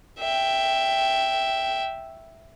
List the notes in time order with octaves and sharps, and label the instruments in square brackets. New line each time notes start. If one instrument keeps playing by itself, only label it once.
[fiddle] E5 G5